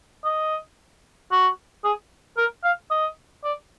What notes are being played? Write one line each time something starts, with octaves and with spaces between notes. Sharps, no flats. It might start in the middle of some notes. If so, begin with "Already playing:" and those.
D#5
F#4
G#4
A#4
F5
D#5
D5